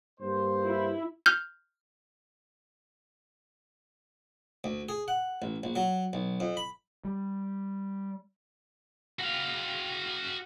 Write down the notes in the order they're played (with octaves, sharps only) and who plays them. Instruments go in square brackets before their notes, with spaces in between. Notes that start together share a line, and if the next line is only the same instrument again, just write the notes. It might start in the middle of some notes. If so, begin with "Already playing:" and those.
[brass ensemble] G2 A#3 C5
[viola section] E4
[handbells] F6 G6
[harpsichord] D2
G#4
F#5
A1
A#1
F#3
B1
F2
B5
[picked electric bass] G3
[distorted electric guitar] F#4 F5